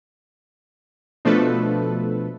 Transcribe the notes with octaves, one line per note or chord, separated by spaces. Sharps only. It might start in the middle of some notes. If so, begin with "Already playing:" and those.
B2 F3 A3 D4 A4 B4